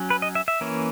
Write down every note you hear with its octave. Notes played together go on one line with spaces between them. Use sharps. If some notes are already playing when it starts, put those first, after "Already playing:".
Already playing: F#3 C#4
B4
D#5
E5
E5
E3 A#3 C#4